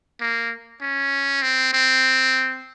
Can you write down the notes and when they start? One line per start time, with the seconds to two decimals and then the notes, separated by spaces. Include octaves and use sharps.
0.21 A#3
0.82 C#4
1.42 C4
1.73 C4